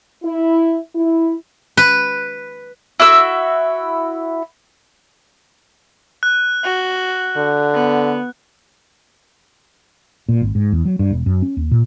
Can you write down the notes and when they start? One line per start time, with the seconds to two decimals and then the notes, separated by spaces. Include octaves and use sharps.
0.24 E4
0.95 E4
1.77 B4
3.00 E4 F#4 E5 E6
6.23 F#6
6.64 F#4
7.37 D3
7.74 B3
10.29 A#2
10.42 G#1
10.55 G#2
10.72 E2
10.85 F#3
10.99 G2
11.11 E1
11.26 F#2
11.42 C#4
11.57 D#2
11.71 A#2